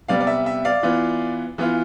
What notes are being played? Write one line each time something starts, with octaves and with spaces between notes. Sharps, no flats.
C3 G3 B3 D5 F5
D5
E5
E5
D5 F5
E3 B3 F4
E3 B3 F4